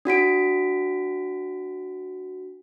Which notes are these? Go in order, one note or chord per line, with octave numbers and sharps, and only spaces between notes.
D4 F#4 B6 D7